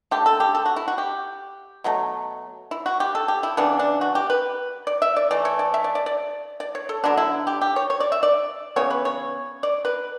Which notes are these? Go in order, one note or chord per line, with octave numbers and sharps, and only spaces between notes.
D3 A3 G4
A4
G4
A4
F#4
E4
F#4
G4
B2 F#3 A3
E4
F#4
G4
A4
G4
E4
C#3 E3 B3 D4
D4
F#4
G4
B4
D5
E5
D5
E3 A3 D5
C#5
D5
E5
D5
D5
D5
D5
C#5
A4
D3 F#3 B3 D4
E4
G4
G4
C#5
C#5
D5
E5
D5
C#3 E3 B3 C#5
B4
C#5
D5
B4